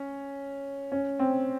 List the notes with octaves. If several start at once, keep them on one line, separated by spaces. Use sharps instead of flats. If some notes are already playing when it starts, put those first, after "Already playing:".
Already playing: C#4
C#4
C4